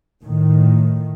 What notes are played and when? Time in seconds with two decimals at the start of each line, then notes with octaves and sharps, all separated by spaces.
0.22 A2 D#3